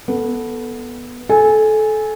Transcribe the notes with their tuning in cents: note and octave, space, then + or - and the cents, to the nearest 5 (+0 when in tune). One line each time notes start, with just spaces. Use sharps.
B3 -10 A4 +0
A4 -25 G#5 +0